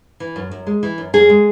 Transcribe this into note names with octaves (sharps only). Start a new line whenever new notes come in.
E3
F#2
F#2
G#3
E3
F#2
F#2 G#4
G#3